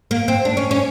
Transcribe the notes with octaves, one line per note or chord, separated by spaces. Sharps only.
A#3
C4
D4
C#4
C#4